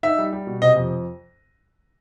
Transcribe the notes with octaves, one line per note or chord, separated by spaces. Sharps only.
D#4 E5
G3
G3
B2
C3 D#5
F2